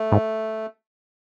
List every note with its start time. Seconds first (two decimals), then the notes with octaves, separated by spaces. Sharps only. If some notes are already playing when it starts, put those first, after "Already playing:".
Already playing: A3
0.12 G#2